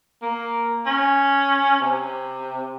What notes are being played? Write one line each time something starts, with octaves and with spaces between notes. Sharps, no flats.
A#3
C#4
C3